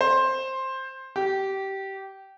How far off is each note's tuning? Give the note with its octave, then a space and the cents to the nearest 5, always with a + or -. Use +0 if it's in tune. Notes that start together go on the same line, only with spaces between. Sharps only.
C5 +10
G4 -20